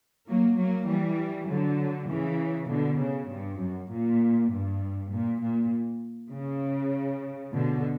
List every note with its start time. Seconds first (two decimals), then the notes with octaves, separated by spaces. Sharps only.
0.28 F#3 A#3
0.58 F#3 A#3
0.88 E3 G3
1.48 D3 F#3
2.09 C#3 E3
2.69 B2 D3
3.00 C#3
3.30 G2
3.60 F#2
3.91 A#2
4.51 G2
5.12 A#2
5.41 A#2
6.32 C#3
7.53 B2 D3